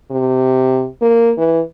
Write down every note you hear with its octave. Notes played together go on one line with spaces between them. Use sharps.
C3
A#3
E3